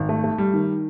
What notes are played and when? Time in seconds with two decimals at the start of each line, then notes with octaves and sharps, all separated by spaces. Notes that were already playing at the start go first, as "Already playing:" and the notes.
Already playing: G#1
0.09 A3
0.24 A3
0.38 G3
0.53 D#3